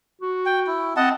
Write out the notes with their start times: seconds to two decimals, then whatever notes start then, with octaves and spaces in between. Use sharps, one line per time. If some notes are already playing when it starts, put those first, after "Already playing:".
0.21 F#4
0.46 G5
0.67 E4
0.96 C4 D#5 F#5 A5